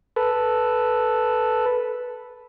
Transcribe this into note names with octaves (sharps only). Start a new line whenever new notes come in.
A4 B4